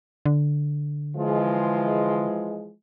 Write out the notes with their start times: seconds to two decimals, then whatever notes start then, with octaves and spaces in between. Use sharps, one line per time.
0.26 D3
1.16 E3 F3 G#3